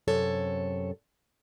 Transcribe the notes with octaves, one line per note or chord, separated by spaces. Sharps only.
F#2 C3 A4 C#5